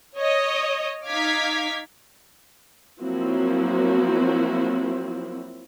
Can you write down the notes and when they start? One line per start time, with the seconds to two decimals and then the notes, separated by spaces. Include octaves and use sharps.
0.16 C#5 D#5
1.07 D#4 F5 D6 F6 G#6 B6
3.01 F3 F#3 A#3 C4 E4 F#4